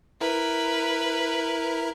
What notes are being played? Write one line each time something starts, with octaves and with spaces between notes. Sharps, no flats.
E4 A#4 B4